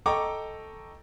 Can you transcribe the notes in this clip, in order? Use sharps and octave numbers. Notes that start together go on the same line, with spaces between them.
A4 D#5 G5 A#5 C#6 D6